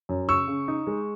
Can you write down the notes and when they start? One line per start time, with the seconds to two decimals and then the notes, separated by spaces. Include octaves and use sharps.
0.09 F#2
0.29 C#3 C#6 E6
0.48 C#3
0.68 D#4
0.87 G#3